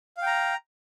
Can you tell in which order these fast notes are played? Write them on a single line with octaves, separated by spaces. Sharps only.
F5 G5 A#5